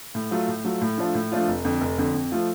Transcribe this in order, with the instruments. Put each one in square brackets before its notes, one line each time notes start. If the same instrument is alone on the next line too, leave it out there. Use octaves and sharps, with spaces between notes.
[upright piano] A2
F#3 A3 F4
A2
F#3 A3 F4
A2
F3 A3 D4 F4
A2
F3 A3 D4 F4
F1
F2 D3
F1
F2 D3
F2
F3 A3 F4